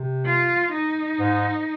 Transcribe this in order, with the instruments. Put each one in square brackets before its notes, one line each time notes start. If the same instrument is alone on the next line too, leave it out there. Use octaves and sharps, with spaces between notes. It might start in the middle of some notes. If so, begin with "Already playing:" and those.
Already playing: [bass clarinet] C3
[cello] F4
D#4
[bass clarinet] G#2